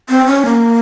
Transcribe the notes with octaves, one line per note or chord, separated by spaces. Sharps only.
C4
C#4
A#3